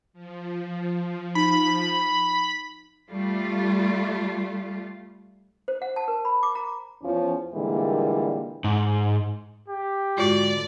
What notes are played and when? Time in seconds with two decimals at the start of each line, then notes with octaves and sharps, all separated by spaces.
0.13 F3
1.35 D#4 B5
3.10 G3 A3 F4
5.68 C5
5.82 F#5
5.96 A5
6.08 A#4
6.25 B5
6.43 D6
6.55 A#5
7.03 E2 F3 C#4
7.55 A#2 D3 E3 G3 G#3 A#3
8.64 G#2
9.68 G4
10.18 G#2 D3 F4 F#4 D5